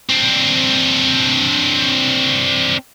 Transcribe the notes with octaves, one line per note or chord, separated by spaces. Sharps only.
C4 D4